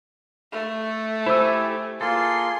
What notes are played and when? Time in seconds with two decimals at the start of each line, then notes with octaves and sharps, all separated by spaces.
0.52 A3
1.26 E4 G4 C5 G#5 E6
2.01 A#3 F4 G#4 A4 C6